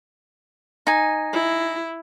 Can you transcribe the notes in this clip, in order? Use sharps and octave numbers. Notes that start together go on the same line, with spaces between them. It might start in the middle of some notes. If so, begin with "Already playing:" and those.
D#4 G#5
E4